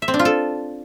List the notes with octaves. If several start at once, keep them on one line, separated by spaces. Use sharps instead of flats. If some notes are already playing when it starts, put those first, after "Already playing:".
E5
C4
D4
F4
A4